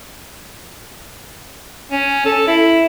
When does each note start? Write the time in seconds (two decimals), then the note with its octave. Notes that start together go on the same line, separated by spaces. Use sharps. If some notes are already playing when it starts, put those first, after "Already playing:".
1.91 C#4
2.25 A4
2.48 E4